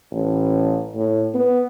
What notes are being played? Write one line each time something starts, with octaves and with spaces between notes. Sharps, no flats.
A1
A2
B3